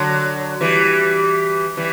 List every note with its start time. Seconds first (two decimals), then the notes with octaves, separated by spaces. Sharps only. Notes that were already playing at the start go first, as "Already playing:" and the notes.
Already playing: D3 F#3
0.61 E3 G3
1.77 E3 G3